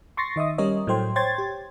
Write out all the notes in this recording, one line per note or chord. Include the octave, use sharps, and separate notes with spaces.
C6 C#6 A6 A#6 C7
D#3 D#5 E5 D#6
G3 C#4 A#4 C#5 D#5
A2 F#3 A3 C5 G5 C6
C5 C#5 G5 C6 G#6 A6
G4